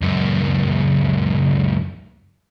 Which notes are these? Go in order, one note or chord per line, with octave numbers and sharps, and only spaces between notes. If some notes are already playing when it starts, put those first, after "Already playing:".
C#2 F#2